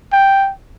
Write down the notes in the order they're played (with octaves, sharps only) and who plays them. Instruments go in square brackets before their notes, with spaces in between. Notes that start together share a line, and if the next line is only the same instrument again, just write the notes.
[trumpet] G5